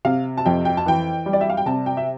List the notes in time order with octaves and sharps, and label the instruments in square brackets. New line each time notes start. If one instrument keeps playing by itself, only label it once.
[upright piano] C3 F5
A5
F2 G5
G5
A5
E3 G5
G3
D5
E5
F5
G5
C3 A5
G5
E5